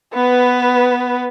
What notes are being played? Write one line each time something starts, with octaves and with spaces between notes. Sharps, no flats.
B3 B4